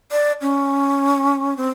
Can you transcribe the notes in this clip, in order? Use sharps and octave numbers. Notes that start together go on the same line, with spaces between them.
D5
C#4
C4